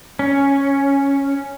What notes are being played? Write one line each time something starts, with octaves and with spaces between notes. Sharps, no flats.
C#4